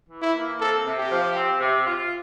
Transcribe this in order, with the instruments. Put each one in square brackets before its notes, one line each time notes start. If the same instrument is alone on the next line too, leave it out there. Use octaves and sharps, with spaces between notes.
[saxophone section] E3
[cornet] E4
[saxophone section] A#3
[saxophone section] C4 [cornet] A4
[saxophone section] C3
[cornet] G4
[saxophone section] F3
C4
C3
F4